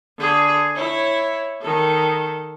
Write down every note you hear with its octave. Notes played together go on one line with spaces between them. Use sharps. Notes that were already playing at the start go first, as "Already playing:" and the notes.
D3 G#4
E4 C#5
D#3 A4